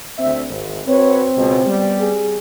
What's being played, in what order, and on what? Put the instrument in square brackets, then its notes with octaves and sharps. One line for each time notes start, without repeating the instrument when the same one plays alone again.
[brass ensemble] D2 C4 E5
G#1
[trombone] C4 [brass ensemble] F#4 B4 C#5
[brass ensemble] C#2 B2
G3 B3
[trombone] G#4